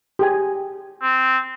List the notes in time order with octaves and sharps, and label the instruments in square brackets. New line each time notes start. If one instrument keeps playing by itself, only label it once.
[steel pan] G4 G#4 G#5
[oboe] C4